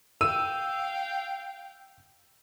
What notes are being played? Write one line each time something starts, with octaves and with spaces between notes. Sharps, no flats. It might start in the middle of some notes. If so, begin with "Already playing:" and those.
F5 G5 E6 D#7